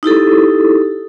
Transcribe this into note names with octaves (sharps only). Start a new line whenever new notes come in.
D#4 E4 G4 A4